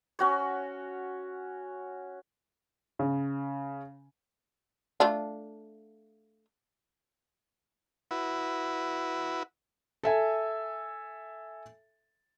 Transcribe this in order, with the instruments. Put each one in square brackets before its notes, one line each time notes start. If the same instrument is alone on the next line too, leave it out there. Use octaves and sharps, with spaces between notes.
[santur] C#4 F#4 C#5
[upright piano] C#3
[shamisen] A3 D4 F4
[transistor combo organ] E4 F#4 B4
[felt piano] A4 E5 G#5